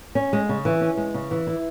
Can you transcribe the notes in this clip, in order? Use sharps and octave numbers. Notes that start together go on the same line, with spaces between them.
C#4
G#3
C#3
E3
C#4
G#3
C#3
E3
E4